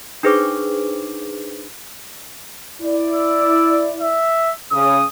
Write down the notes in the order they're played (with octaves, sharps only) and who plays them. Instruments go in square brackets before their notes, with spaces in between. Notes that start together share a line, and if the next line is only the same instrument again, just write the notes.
[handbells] D4 D#4 G#4 B4 C5 D6
[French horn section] E4 D5
[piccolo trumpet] E6
E5
[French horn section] C#3 [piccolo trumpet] D#6